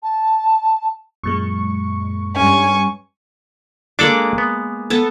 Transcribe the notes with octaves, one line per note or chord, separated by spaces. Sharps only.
A5
F#2 A#2 G#3 C#6
G2 C#4 G#5 C#6
G#3 A#3 D4 A4 D5 D6
B3
B3 A4